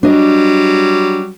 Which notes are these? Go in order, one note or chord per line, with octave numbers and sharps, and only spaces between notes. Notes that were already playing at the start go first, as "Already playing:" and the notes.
F#3 G3 D4 D#5